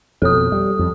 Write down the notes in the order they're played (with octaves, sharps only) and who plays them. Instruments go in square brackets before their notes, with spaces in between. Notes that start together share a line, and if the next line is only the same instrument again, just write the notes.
[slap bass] F2 B2 [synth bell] A4 D#6
[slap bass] G3
F2